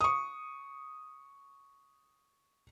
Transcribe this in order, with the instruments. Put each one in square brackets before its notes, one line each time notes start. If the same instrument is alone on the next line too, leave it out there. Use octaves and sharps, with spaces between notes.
[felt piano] C#6 D#6